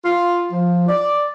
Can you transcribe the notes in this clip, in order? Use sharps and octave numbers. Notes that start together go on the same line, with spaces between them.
F4
F3
D5